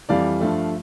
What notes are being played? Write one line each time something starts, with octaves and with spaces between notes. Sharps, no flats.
F2 E3 G3 D5 F5
G2 F3 A3